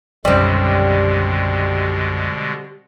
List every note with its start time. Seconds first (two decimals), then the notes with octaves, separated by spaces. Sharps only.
0.25 B1 F#2 B2 D3 G3 G#3 C4